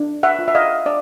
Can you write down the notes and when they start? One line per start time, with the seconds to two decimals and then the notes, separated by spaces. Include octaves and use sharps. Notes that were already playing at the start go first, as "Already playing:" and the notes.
Already playing: D4
0.23 E5 F#5
0.39 F4
0.48 E5
0.55 D#5 F5
0.86 D4 D5